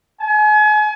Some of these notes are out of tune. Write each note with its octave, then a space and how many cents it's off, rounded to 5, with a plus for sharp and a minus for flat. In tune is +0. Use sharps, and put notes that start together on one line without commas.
G#5 +35